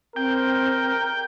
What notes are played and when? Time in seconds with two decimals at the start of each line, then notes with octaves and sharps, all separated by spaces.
0.16 C4 A#4 G5